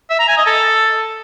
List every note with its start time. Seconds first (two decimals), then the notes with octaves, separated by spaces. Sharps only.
0.10 E5
0.19 A#5
0.28 G#5
0.37 D#5
0.46 A4